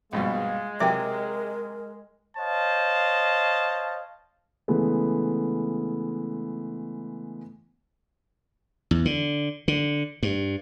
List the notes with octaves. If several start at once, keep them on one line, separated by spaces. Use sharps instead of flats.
A#1 G2 B2 G#3 F5
C3 F#3 A#4 E5 G5 D6
C5 C#5 D#5 F5 A5
C#3 E3 G#3 A3 B3
E2
D3
D3
G2